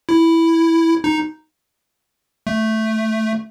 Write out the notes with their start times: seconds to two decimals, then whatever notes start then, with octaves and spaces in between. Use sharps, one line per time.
0.09 E4
1.04 D#4
2.47 A3